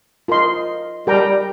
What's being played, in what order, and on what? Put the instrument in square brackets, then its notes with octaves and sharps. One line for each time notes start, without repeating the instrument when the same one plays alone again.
[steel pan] F4 A#4 D#5 C6
[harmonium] G3 [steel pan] G4 A#4 G5 A#5